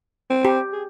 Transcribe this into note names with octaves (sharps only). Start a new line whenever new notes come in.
C4
G4
G#4